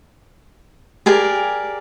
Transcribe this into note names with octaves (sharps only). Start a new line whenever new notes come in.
G4 G#4 A#4 D5